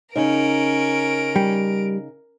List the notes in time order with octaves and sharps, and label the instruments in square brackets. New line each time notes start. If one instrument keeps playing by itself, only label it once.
[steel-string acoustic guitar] C#3 D#4 [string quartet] C#4 [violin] A#4 D7
[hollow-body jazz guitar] G3